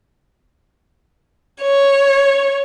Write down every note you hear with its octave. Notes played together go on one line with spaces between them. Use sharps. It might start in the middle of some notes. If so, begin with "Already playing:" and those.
C#5